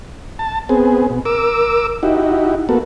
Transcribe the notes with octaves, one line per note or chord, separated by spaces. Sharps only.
A5
B3 C4 G#4
B2
A#4 D6 E6
D#4 E4 F#4 G4
A#3 B3 F#4 A4